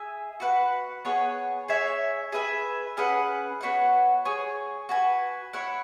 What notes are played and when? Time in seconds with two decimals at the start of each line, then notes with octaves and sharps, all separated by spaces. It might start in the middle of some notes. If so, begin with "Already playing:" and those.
Already playing: G#4 E5 G#5
0.40 F#4 B4 F#5
1.05 B3 G#4 C#5 F#5
1.68 G#4 C#5 E5 G#5
2.32 G#4 B4 E5 G#5
2.97 C#4 G#4 B4 F#5
3.61 B3 F#4 C#5 F#5
4.25 G#4 C#5 G#5
4.89 F#4 B4 G#5
5.53 E4 C#5 F#5